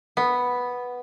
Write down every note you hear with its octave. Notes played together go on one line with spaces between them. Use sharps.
B3